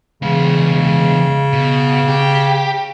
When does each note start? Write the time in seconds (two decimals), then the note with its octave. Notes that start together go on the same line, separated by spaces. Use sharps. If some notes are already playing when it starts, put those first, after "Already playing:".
0.22 E2 C#3 G#3
1.53 B2
2.08 G4